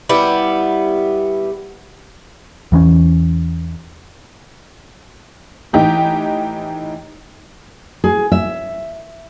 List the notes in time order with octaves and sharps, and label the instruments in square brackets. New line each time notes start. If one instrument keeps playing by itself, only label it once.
[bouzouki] G3 B3 E4
[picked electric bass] E2 E3 B3 C#4
[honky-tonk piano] A2 E3 D#4 G4
[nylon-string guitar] G#4
E5